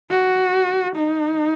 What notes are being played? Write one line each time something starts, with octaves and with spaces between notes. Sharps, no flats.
F#4
D#4